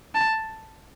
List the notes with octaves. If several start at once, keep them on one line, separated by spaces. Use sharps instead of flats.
A5